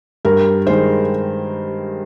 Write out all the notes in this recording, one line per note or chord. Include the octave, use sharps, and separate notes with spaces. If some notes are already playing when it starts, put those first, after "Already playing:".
G2 A#4
D#3 G#3 C5